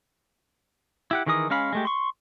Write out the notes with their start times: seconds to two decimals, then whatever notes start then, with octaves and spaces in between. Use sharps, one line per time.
1.11 E4 G4 F#5
1.26 D#3 E3 G#4 A#4 D#6
1.50 G#3 C#4 F5 B5
1.73 G#3 A3 G4
1.85 C6 C#6